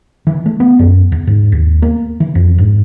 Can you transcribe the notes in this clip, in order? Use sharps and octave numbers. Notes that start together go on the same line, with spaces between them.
E3
A3
B3
F#2
E2
G#2
D#2
A#3
E3
F2
G#2